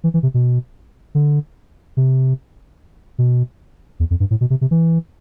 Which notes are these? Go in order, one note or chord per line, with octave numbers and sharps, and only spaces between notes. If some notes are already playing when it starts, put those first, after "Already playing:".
E3
E3
C3
B2
D3
C3
B2
E2
F2
G2
A2
B2
C3
C3
E3